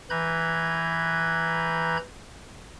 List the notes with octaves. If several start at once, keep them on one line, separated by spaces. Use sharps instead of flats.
E3 B4 A#5 B5 G6 G#6